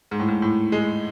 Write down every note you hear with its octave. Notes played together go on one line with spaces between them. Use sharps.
G#2
A2
G#2
A2
G#3